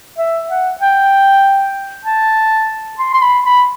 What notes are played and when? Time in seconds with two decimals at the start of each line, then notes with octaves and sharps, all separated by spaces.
0.18 E5
0.50 F#5
0.80 G5
2.05 A5
2.99 C6
3.14 C6
3.22 B5
3.45 B5